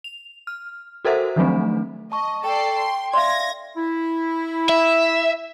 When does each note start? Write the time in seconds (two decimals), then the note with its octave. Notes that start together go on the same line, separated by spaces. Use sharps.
0.04 F7
0.47 F6
1.05 F#4 A4 A#4 C5 E5 F#5
1.36 D#3 F3 F#3 A3 C4 D4
2.12 D#5 A5 C#6
2.44 A4 D5 G5 C7
2.78 C6
3.14 D5 E5 F5 C6 G#6 A#6
3.77 E4
4.69 E5